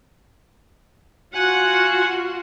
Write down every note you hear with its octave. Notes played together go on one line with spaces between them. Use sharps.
F4 F#4 F#5 G#5 F#6